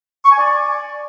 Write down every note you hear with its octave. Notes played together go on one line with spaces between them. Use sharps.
C#6
G#5
D5